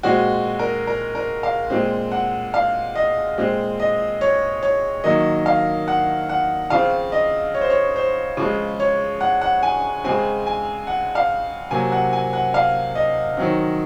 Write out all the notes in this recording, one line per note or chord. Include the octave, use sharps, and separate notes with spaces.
A#2 G#3 C4 F#4
A#4
A#4
A#4
F5
A#2 G#3 C4
F#5
F5
D#5
A#2 G#3 C4
D#5
C#5
C#5
D#3 F#3 A#3 D#5
F5
F#5
F#5
C#3 F3 C4 F5
D#5
C#5
C5
C#5
C5
C#3 F3 G#3
C#5
F#5
F#5
G#5
C#3 G#3 C4 G#5
G#5
F#5
F5
C3 F#3 A#3 G#5
F#5
G#5
F#5
F5
D#5
D#3 F#3 C4